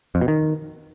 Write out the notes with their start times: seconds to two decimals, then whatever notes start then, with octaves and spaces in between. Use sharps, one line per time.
0.15 F2
0.21 B2
0.28 D#3